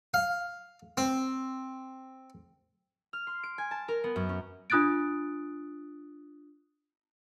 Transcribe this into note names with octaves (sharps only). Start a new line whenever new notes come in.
F5
C4
F6
C6
D7
G#5
A5
A#4
B3
F#2
C#4
D4 F4 D#6 F#6 A6 D7